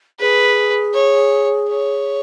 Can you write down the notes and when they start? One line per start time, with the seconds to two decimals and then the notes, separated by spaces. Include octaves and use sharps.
0.19 G#4 B4
0.94 C#5
1.69 C#5